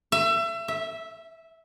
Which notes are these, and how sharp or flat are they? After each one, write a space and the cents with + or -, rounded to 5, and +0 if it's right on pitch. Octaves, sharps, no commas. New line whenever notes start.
E5 +30
E5 -10